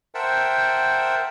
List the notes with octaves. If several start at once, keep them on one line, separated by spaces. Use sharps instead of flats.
A#4 C5 E5 F#5 G5 A5